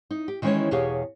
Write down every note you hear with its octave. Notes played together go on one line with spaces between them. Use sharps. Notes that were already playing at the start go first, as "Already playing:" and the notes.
D#4
G4
D#3 E3 G#3 C#4 C5 C#5
E2 B2 G4 G#4 C#5 F5